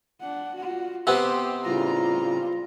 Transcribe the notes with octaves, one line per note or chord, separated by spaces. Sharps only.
D4 F#5
F4 F#4
C3 B3 C4 G4 C5
A2 C#3 G3 F4 A#5